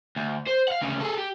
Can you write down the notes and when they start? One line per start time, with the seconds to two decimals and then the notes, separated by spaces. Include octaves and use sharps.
0.16 D2
0.47 C5
0.68 F5 F#5
0.82 D2 C#3
1.01 G#4 A4
1.18 G4